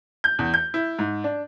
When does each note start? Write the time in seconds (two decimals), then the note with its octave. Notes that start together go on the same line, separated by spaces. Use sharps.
0.24 G6
0.39 E2
0.54 G6
0.74 E4
0.99 G#2
1.24 D4